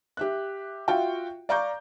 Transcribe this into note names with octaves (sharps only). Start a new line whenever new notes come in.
G4 E5 F#6
F4 F#4 E5 F5 G5
D5 F5 A#5 C#6 D6 G6